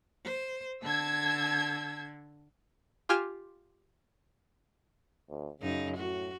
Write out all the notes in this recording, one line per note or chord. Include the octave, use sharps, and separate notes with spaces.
C5
D3 A5 E6 G#6
F4 G4 G#5 F6 E7
D2
F#2 C#3 D#4
A2 F#4